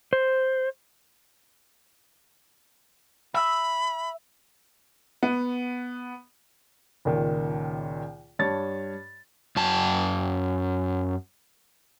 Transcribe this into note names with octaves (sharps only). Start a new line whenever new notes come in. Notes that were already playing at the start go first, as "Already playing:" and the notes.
C5
E5 B5
B3
C#2 A#2 D#3
G2 C#5 A5 A6
F#2 A5